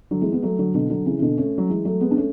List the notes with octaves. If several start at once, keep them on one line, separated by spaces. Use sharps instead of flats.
D3 F#3
E3 G#3
G#3 B3
F#3 A3
D3 F#3
B2 D3
D3 F#3
C#3 E3
E3
B2 D3
A3 C#4
F#3
E3 G#3
F#3 A3
G#3 B3
D4
A3 C#4